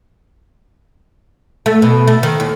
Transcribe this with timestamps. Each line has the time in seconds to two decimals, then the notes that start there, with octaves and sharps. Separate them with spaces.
1.66 A3
1.82 B2
2.07 A3
2.23 D#3
2.40 D#2